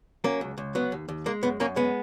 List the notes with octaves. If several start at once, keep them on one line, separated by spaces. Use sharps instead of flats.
F#3 A#3 C#4
C#2
C#2
F#3 B3
D#2
D#2
G#3 A#3
F#2 B3
F#2 A#3 C#4
G#3 B3